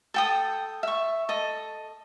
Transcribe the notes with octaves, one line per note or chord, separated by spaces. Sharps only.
A4 G5 D#6
E5 C#6
A4 D#5